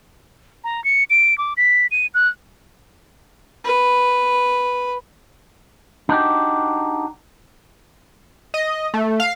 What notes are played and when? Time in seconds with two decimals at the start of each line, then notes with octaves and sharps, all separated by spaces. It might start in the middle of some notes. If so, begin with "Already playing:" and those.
0.64 A#5
0.84 C#7
1.10 D7
1.38 D6
1.57 B6
1.91 D#7
2.14 F#6
3.64 B4
6.09 D4 D#4 F#4 G4
8.54 D#5
8.94 A3
9.20 F5